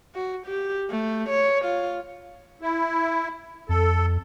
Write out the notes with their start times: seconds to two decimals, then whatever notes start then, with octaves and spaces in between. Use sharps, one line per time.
0.15 F#4
0.46 G4
0.90 A3
1.29 C#5
1.65 F4
2.62 E4
3.69 F2 A4